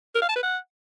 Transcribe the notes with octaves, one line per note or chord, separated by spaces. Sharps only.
A#4
F5
A5
B4
F#5